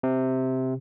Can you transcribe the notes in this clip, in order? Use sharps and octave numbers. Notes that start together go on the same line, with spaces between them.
C3